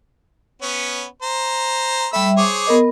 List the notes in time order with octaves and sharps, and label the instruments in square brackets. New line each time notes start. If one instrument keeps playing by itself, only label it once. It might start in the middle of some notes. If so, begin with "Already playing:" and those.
[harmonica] B3 C#4 C#5
C5 A#5
[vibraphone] G3 E5 [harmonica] A3 B5 E6
[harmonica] G#4 C5 C#5 [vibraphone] D6
[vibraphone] B3 A#4 D#5